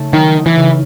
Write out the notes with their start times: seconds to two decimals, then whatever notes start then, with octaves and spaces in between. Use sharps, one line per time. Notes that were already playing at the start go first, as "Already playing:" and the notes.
Already playing: C#3 A3 D#4
0.13 D#3 F#3
0.35 D#4
0.46 E3
0.56 C#3